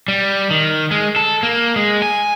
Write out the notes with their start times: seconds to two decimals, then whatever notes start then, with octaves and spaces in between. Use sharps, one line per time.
0.08 G3
0.51 D#3
0.91 G#3
1.16 A4
1.43 A#3
1.76 G#3
2.02 G#5